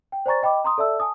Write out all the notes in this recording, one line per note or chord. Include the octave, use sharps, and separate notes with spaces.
G5
C5 D5 G#5 A#5 C#6 A6
D#5 G5 B5 D6
A#5 C6 D#6
A4 D5 E5 A5 E6
G#5 A5 D#6